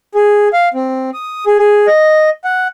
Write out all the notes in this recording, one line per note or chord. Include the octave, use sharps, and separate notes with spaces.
G#4
F5
C4
D#6
G#4
G#4
D#5
F#5